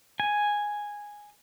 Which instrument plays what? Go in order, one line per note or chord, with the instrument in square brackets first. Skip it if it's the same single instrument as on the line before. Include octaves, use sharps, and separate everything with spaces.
[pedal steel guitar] G#5